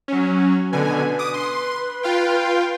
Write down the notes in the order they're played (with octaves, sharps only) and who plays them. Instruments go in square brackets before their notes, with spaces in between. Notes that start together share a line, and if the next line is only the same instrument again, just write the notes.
[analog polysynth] F#3 C#4
[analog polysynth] B2 D3 G#5 [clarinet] B4
[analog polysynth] D6 D#6
C6
F4 F5 G5